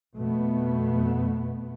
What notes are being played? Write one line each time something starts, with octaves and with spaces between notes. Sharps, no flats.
F2 B2 A3 B3